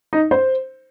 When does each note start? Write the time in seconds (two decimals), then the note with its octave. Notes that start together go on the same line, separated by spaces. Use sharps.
0.13 D#4
0.31 C5